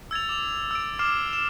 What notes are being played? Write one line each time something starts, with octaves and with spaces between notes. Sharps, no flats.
E6 G#6 A6 F7
D6 F7
E6 D7
D6 F6 C7 E7
E7